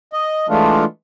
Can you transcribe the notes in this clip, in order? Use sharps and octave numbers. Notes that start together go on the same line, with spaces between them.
D#5
E3 G#3 A3 D4 F4